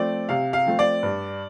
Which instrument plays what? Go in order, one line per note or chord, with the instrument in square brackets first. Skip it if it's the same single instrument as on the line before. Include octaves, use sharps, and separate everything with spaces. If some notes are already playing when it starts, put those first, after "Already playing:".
Already playing: [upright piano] F3 A3 C4 D5
C3 F5
F5
F3 A3 C4
D5
G2